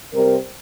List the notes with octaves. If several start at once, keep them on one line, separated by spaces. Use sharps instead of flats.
C3 G3 C4 A#4